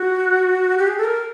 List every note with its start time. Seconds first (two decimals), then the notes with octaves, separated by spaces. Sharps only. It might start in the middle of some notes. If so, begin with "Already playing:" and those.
Already playing: F#4
0.78 G4
0.87 G#4
0.97 A4
1.04 A#4